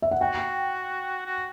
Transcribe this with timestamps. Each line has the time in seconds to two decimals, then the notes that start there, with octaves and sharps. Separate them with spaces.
0.02 E5
0.11 F#5
0.21 F#4 G5
1.26 F#4